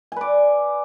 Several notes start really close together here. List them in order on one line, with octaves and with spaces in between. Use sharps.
G#5 B4 D5